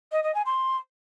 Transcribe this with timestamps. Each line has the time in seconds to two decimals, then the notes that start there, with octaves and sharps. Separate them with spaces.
0.12 D#5
0.23 D#5
0.34 G#5
0.46 C6